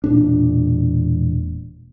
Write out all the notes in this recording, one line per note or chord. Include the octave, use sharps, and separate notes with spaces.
E1 A#2 D4